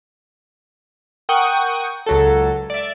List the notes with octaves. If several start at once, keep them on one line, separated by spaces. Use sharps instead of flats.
A#4 F#5 G5 C#6 D#6
C#2 F#3 A4
D5 E5